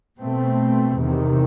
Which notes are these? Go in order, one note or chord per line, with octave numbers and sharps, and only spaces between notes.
B2 A3 C4
E2 C3 D#3